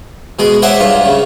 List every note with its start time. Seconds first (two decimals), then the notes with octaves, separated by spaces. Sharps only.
0.39 B2 G#3 G#4
0.62 C5 C#5 E5 F#5 G#5 D6
0.80 G2 F4
1.05 C#3